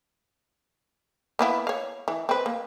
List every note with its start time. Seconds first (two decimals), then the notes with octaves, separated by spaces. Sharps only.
1.39 A#3 B3 E4
1.67 C#5 F5
2.08 E3
2.29 C4 B4
2.46 A#3